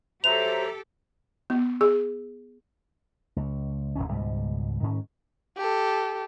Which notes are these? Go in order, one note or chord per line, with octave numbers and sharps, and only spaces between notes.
F#3 G4 A4 C5 E5 A#5 F7
B3
G#4
C#2
D1 C#2 D#3 C#4
C#2 G#2 B2 G3
G#2 D#3 C#4
G4 A4